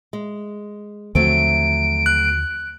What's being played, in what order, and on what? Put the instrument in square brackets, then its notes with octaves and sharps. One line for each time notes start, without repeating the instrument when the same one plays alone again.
[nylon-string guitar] G#3
[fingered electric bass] D#2 D3 F3 [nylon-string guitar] F#3 A3 C4 [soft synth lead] D7
[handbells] F#6